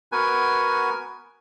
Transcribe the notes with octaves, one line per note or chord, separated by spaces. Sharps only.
B3 F#4 A#4 B4 G#5